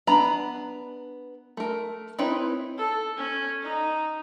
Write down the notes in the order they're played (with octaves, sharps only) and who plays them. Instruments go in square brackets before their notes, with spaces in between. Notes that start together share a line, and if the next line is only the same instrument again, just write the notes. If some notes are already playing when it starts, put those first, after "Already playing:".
[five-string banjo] B3 D4 A#5 B5
A3 A#4
C4 D#4 E4 B4 C#5
[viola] A4
C#4
D#4